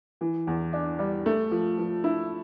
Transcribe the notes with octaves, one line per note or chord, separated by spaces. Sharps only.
E3
E2
D4
G3
A3
F3
F3
E4